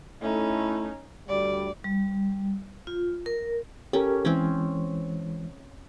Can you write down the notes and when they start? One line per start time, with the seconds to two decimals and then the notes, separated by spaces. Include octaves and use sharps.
0.21 A3 C#4 D#4 E4
1.28 D2 G3 D5
1.84 G3
2.87 F4
3.26 A#4
3.93 C#4 G4 A4 A#4
4.25 E3 G#3 C4 C#4